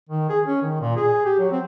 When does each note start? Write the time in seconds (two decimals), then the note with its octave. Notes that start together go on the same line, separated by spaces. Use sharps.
0.09 D#3
0.29 G#4
0.46 C#4
0.62 D#3
0.80 A#2
0.96 G#4
1.26 G4
1.39 F#3
1.52 C4